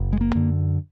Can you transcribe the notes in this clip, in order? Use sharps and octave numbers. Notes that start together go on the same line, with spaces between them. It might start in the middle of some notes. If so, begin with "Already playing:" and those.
Already playing: F#1
G#3
A#3
F#2 D3